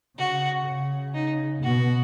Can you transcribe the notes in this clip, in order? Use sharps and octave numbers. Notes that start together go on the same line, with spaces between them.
C#3 F#4
C#3
D#4
B2 F#4